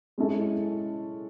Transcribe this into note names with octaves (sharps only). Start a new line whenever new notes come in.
G#3 C#4 E4 A4